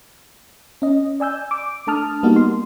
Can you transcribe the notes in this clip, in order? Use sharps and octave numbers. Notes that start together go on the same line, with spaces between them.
C#4 D#5
D5 G#5 E6 G6
D6
A3 D4 A5 D#6 F6
G3 A#3 B3 D#4 F#4
C6